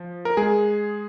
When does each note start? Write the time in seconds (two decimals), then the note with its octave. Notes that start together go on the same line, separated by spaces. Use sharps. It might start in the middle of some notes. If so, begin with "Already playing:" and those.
Already playing: F3
0.25 A#4
0.37 G#3 G#4